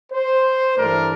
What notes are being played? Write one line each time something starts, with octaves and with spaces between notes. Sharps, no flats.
C5
G2 E3 A3 D4 A#4